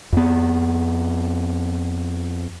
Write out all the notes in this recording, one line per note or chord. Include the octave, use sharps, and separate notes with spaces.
F2 B3